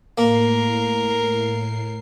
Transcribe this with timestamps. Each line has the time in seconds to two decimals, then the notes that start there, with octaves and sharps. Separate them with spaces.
0.18 A2 A#3 A#4 C7